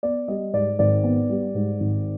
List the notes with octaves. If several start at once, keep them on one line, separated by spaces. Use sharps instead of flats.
B3 D5
G3 D#5
G#2 D5
G#1 D5
B3
G3
G#2
G#1